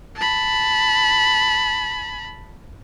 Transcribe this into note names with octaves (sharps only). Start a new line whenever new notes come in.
A5 B5